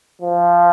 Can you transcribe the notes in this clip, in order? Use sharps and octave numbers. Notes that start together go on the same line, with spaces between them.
F3